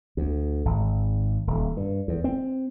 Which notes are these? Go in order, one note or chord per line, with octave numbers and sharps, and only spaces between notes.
D2
G#1
D#1
G2
E2
C4